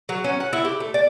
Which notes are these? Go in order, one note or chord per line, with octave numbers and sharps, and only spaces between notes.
F#3
C#4
F#5
E4
G4
A3
D5